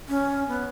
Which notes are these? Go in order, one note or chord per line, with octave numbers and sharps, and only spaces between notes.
C#4
B3